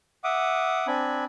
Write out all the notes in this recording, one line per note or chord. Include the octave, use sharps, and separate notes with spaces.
E5 F#5 D6 D#6
C4 D4 G#5 B5